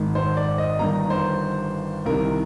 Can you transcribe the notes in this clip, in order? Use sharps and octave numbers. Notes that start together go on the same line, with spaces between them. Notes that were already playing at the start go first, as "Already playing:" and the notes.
Already playing: G#1 G#2 D#3
C5
D5
D#5
G1 G2 D#3 A#5
C5
C2 C3 D#3 A#4